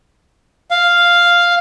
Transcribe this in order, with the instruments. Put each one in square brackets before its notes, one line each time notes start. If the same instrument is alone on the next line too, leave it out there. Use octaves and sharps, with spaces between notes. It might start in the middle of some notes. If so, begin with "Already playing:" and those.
[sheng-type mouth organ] F5